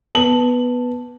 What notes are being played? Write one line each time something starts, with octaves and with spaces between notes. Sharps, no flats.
B3 A5 F#7